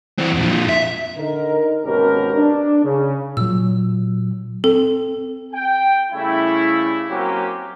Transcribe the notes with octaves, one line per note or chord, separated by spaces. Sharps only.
E3 C4
F2 A#2
E5
D3 D#4 A#4
G#1 D#2 B2 C#4 G4 A#4
D4
C#3
A#2 F#3 E6
C4 A4
G5
C#3 G3 A3 E4
F#3 A#3 C4 C#4 F#4 G4